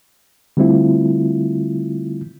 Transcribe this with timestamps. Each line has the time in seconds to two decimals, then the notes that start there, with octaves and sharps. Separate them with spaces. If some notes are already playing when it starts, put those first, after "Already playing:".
0.57 D3 G3 A3 C4 E4 F4